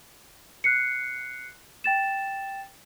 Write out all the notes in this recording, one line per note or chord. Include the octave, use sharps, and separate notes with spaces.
F#6 C7 C#7
G5 A6 E7